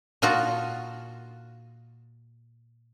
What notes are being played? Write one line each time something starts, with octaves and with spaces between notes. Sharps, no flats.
A#2 D#4 F4 F#4 A5 A#5